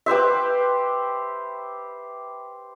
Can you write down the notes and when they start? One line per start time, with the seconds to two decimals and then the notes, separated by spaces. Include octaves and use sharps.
0.06 G4 B4 C5 E5